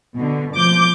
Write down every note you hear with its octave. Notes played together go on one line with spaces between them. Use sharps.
B2 D3
F3 D6 G6